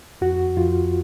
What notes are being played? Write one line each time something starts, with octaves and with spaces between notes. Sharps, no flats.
F2 F#4
F2 F4